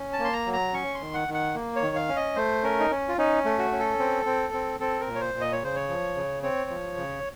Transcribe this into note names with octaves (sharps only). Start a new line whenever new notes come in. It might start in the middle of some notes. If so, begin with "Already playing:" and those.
Already playing: C#4
A5
A#3
C6
A#5
F#3
A#5
C#4 C#6
C6
D#3
F#5
D#3
F#5
A#3
C#5
D#3
F5
C#4
D#5
A3 C5
C#4 A#4
D#4
C#4
F4
C#4 D#4
A3
F#4
C#4
A4
C4
C4
C4
C4 A4
A#4
A#2
C#5
C5
A#2
D#5
C#5
C#3 C5
C#5
F3
C#3
C4 C#5
F3
C#3